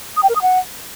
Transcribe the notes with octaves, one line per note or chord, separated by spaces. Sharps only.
D#6
G5
A#4
D#6
F#5